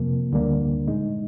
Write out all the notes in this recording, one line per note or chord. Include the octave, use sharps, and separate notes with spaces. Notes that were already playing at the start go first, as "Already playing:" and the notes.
Already playing: F2 C3 F3 A#3
D2 D3 G3 A#3 D4
A#2 G#3 D#4